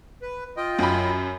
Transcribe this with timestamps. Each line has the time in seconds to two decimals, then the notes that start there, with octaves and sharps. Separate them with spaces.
0.22 B4
0.57 F4 D#5 G5
0.79 F#2 B5